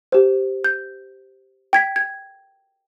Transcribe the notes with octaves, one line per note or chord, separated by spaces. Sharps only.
G4 C5
G6
G5 G#6 B6
G#6